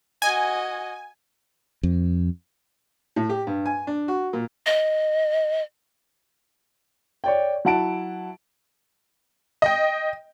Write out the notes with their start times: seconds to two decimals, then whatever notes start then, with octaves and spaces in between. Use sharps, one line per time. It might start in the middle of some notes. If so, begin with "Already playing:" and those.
0.22 F#4 D#5 G#5
1.83 F2
3.16 A2
3.29 G4
3.47 G2
3.66 G#5
3.87 D4
4.08 F#4
4.33 A#2
4.66 D#5
7.24 C#5 D5 G5
7.65 F#3 E4 F#5 A5 D7
9.62 D#5 G5